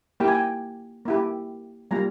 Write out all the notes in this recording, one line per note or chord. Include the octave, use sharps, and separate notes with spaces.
A#3 E4 G4 G5
G#5
G5
A#3 E4 G4
G3 A#3 F4 A#5